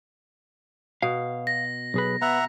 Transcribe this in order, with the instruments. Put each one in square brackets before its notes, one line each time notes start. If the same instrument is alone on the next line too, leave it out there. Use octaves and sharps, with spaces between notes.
[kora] B2 [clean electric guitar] F5
[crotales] A#6
[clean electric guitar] B1 G#4 B4
[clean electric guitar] B3 [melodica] E5 F#5 A#5